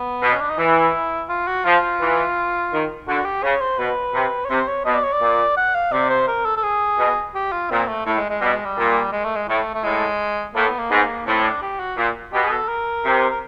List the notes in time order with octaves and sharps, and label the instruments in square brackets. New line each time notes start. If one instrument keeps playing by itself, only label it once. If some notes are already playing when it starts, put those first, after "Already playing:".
Already playing: [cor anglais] B3
[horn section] B2
[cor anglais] C#4
D4
D#4
[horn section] E3 [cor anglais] E4
[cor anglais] F4
F#4
[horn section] F3 [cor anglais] F4
[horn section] E3
D#3
[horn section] D3 [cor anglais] F#4
[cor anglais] G4
[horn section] C#3 [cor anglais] C#5
[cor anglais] C5
[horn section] B2 [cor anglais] B4
[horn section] C3
[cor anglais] C#5
[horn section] C3 [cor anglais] C5
[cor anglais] C#5
[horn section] B2 [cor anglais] D#5
[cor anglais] D5
C#5
D5
[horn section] A#2
[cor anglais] F#5
F5
[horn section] C3 [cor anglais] D5
[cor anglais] C5
A#4
A4
A4
G#4
[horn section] B2
[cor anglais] G4
F4
[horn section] A#2 [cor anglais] C4
[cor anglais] A3
[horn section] A2 [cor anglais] A3
[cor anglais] G#3
G#3
[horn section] B2 [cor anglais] G3
[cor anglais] G#3
G3
[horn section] A#2
[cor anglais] G#3
A3
G#3
[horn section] A2 [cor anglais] A3
[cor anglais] A3
[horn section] A2 [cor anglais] G#3
[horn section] A2 [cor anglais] A#3
[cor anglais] B3
A#3
[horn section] G#2 [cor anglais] B3
[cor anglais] A#3
[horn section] A2 [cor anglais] C4
[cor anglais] D4
G4
F#4
[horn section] A#2
[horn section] B2 [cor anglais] G4
[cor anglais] G#4
A4
A#4
[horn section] C3
[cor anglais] A#4